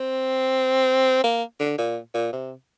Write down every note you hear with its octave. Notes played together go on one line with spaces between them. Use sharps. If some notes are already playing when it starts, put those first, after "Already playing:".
Already playing: C4
A#3
D3
A#2
A#2
C3